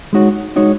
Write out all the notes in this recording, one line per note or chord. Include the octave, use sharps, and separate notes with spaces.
G#3 D#4 F#4 C#5
G#3 D#4 F#4 C#5